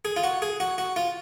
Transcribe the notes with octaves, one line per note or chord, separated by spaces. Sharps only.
G#4
F4
F#4
G#4
F#4
F#4
F4